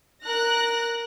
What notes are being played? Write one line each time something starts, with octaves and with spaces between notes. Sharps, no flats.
A#4 F#6 A#6